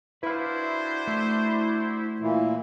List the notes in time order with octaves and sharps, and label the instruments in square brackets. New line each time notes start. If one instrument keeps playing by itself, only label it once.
[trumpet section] D4 F#4 C5 [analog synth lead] E4 [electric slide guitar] B4 F5
[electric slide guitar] A3
[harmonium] A#2 E3